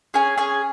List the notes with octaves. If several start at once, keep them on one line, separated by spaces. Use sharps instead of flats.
C#4 G#4 G#5
C#4 G#4 G#5